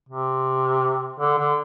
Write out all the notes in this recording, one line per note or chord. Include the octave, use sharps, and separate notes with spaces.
C3
D3
D3